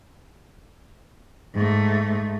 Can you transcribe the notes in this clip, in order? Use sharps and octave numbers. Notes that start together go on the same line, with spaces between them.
G#2 A3